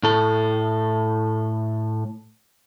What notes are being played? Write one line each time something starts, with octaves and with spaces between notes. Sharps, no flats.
A2 A4